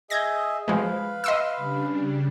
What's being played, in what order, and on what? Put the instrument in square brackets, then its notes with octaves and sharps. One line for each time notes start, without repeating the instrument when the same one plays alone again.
[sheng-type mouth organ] G#4 D#5 E5 [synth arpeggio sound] G6 G#6 A#6
[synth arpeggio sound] F3 G#3 [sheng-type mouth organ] B4 F5
[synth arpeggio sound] D#5 C6 E6
[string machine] C#3 G3 D4